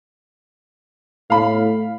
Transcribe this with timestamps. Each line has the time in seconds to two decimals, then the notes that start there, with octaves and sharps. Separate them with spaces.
1.30 A2 F5 B5